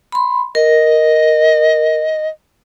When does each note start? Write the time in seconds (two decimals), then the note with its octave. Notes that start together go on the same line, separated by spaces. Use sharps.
0.12 B5 C6
0.55 A#4 D#5